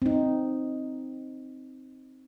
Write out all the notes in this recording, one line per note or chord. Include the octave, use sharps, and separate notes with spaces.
C4 D#4